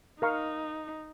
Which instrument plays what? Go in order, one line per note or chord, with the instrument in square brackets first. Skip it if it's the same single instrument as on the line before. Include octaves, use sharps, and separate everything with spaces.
[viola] D#4 [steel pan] A#4 F5 A#5 C#6